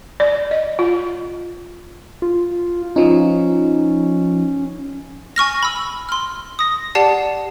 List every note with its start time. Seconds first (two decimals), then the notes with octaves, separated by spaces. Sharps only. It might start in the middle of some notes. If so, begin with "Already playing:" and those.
0.20 D5
0.51 D#5
0.79 F4
2.22 F4
2.96 F3 C#4 D#4
5.36 G#5 C#6 F6 A#6
5.63 B5 E6
6.09 C6 F6
6.59 D#6 A#6
6.95 G4 D5 F#5 A5 C7